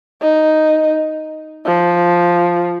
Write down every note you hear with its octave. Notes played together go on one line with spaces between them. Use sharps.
D#4
F3